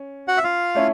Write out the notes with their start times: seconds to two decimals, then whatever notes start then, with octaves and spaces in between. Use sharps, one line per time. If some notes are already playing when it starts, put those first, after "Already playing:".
Already playing: C#4
0.28 F#4 F#5
0.37 E5
0.44 F4 F5
0.75 A3 C#4 E4